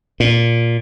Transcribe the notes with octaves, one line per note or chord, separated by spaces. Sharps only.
A#2